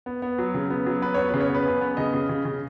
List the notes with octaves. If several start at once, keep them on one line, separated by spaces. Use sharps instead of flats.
B3
B3
F#3
C#3
B3
F#3
B3 B4
B3 C#5
B4
C#3
C#5
B3 B4
F#2
B3
C#3 D#5
C#3
C#3
C#3